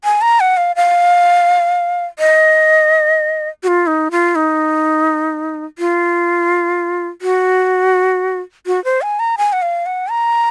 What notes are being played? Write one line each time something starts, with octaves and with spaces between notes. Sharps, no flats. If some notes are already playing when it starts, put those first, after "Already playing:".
G#5
A#5
F#5
F5
F5
D#5
F#4
F4
D#4
F4
D#4
F4
F#4
F#4
C5
G#5
A#5
G#5
F#5
F5
F#5
A#5